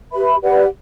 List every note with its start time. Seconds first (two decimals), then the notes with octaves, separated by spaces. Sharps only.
0.12 G4 B4 E5 B5
0.41 G4 B4 D5 F#5